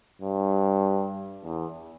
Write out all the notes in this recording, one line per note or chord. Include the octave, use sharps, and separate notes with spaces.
G2
E2